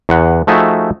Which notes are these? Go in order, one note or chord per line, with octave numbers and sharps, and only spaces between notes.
E2 F#5
F3 A3 D#4 F#4 G#4 E5